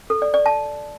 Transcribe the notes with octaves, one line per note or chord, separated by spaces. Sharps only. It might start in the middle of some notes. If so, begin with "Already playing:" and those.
A4
D5
D5
A5